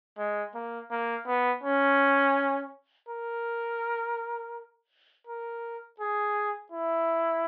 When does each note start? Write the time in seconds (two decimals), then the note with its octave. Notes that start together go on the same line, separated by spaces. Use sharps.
0.18 G#3
0.55 A#3
0.91 A#3
1.27 B3
1.64 C#4
3.09 A#4
5.27 A#4
6.00 G#4
6.72 E4